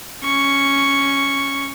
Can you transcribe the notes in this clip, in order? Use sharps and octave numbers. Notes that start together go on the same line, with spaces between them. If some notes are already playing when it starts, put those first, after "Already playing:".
C#4 C#6